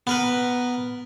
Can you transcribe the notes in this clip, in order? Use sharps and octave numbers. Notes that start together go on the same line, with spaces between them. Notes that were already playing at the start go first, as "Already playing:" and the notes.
B3 A#4 B4